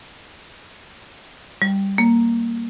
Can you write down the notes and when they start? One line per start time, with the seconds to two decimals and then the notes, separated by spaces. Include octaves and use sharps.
1.62 G3
1.98 A#3